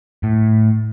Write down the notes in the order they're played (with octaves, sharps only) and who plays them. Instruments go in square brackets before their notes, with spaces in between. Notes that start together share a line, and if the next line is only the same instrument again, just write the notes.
[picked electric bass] A2